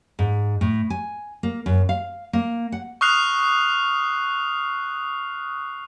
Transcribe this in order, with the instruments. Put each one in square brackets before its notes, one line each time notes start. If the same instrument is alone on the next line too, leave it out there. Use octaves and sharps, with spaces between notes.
[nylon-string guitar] G#2
A2
G#5
A#3
F#2
F5
A#3
F#5
[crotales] C#6 D#6 F6 F#6 C7 F7